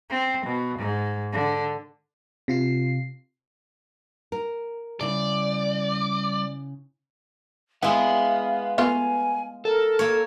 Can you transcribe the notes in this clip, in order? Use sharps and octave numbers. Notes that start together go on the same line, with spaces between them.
C4
B2
G#2
D3
C3 F4 C7
A#4
C#3 G3 E4 D5
G#3 E4 B4 F5 F#5
A3 B3 F4 F5 G#5
A4 A#4
A#3 C#5